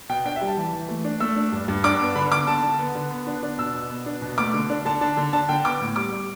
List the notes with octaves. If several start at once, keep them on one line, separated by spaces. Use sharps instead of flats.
B2 G5
D4 G5
E5
G3
A5
E3
E3
A3
D4
A3 E6
D4
G2
G2
D4 D6
B3
D3 B5
D3 D6
D3 A5
D3
B3
D3
B3
D4
D4
B2 E6
B2
B3
D4
B2
A3 D6
D3
D4
D3 A5
D4 A5
D3
D4 A5
D3 G5
B3 D6
A2
G3 D6
G3